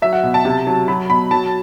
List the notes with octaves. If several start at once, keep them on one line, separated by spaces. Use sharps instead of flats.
F#3 E5
F#5
B2
A5
C3
F#3
F#3 B5
B2 B5
F#3 A5